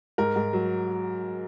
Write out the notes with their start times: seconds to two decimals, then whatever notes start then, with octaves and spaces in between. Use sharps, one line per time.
0.18 G#2 A#4
0.36 G#2
0.53 F#3